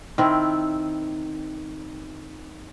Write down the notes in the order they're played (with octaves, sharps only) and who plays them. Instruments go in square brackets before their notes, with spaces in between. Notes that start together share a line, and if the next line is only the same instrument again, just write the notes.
[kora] D#3 C4 E4